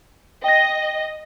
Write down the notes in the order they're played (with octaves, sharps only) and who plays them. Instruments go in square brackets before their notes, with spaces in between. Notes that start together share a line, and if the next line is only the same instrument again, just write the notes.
[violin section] D#5 [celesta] G5 A#6